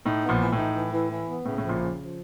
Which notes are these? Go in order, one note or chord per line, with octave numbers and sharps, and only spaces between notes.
A2 D#4
B3
A#1 A#2
E3
A2
D#4
E3
E3
E3
B3
A2 C#3
A2 F3
A#1 A#2
C#3
F3